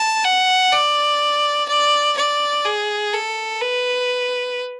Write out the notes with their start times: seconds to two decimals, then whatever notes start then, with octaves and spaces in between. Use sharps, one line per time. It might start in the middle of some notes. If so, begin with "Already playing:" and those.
Already playing: A5
0.24 F#5
0.72 D5
1.68 D5
2.17 D5
2.65 G#4
3.13 A4
3.61 B4